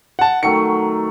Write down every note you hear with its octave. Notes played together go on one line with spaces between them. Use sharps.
F#5 A5
D#3 F#3 A3 C#7